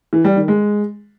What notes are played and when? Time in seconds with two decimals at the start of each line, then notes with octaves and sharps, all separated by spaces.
0.13 E3
0.24 G3
0.36 D#3
0.48 G#3